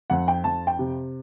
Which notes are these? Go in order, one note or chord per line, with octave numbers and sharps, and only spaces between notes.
F2 F#5
G5
F2 A5
G5
C3